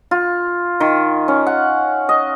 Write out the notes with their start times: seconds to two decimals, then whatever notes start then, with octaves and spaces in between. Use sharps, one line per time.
0.11 F4
0.80 D#3
1.28 C#4
1.46 F#5
2.09 D#5